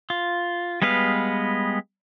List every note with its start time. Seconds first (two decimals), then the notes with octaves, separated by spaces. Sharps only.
0.10 F4
0.82 G3 G#3 B3 B4 F5